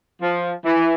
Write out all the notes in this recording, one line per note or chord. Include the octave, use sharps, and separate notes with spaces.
F3
E3